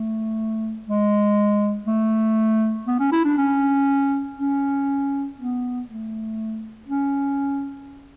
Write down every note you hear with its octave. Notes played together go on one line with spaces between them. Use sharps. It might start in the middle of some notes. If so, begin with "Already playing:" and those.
Already playing: A3
G#3
A3
B3
C#4
E4
D4
C#4
C#4
B3
A3
C#4